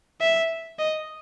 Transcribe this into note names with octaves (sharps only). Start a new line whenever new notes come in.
E5
D#5